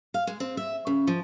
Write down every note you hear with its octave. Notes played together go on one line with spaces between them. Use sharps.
F5
G#3
C4
E5
C#3
F3